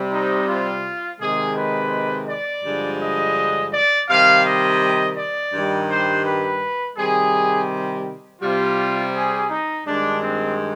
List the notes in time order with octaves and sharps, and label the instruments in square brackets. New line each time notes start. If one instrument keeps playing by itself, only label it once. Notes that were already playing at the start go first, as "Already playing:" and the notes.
Already playing: [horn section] C3 G3
D#4
F4
C3 D#3 G#3 G#4
B4
D5
G2 D3 F3 G#3
D#5
D5
C3 D#3 G3 F5
D#5
D5
G2 D#3 G3
C5
B4
C3 D#3 G3 G#4
C3 G3 F4
G#4
D#4
G2 D#3 G#3 D4
C4